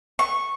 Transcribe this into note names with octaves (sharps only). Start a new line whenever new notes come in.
C#6